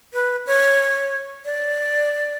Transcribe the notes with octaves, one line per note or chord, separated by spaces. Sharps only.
B4
C#5
D5